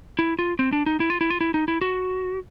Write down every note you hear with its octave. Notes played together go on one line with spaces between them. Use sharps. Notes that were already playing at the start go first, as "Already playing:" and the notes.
E4
F4
C4
D4
D#4
E4
F4
E4
F4
E4
D#4
E4
F#4